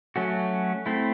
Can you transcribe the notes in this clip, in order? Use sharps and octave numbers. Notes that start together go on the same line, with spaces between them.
F#3 A3 C#4 F#4
A3 C4 E4